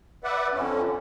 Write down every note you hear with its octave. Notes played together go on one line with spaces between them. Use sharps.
B4 D5 E5 F#5
F2 D3 C#4